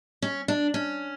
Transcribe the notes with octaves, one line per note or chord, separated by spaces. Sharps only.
C#4
D4
C#4